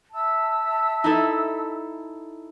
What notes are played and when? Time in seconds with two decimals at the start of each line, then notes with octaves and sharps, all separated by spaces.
0.14 E5 A5 E6
1.04 D#4 E4 A4